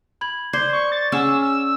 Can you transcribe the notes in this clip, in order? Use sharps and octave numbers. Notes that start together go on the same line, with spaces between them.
B5 G#6 F#7
C5 D5 G#6 C7 G7
C#6
A6
C#4 G#4 F#5 G#5 E6
E6